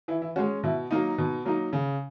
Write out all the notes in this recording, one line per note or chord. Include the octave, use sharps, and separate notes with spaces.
E3 E4
E4
G#3 C#4 F#4
B2 E4
F#3 A#3 D#4
B2
F#3 A#3 D#4
C#3